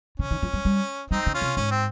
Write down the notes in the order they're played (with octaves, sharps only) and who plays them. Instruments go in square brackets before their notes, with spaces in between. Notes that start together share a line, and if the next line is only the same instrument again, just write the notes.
[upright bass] C#3 [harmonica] C#4
[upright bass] D#3
F3
G3
G3
[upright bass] G3 [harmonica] C4 D#4
[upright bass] C#3
[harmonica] C#4 F4
[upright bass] C3
[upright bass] G#2 [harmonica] C#4
[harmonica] C4